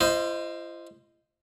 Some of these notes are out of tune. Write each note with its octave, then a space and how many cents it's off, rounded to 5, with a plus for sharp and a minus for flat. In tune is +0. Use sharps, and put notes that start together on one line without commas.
F4 -45 C5 +0 D#5 +0